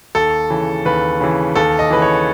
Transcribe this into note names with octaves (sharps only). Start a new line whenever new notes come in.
D#2 A4
C#3 E3
D#2 B4
C#3 E3
D#2 A4
D#5
C#3 E3 B4
C#5